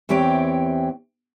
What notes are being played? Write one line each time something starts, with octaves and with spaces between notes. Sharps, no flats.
E2 E3 C4 G4 C#5 G5